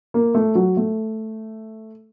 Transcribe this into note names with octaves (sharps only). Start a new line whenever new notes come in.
A#3
A3
F#3
A3